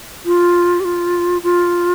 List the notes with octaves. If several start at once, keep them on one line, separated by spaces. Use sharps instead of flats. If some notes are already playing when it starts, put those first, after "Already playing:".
F4
G4
F4
F4